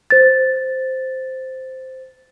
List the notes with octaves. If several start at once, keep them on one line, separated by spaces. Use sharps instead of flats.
C5 A6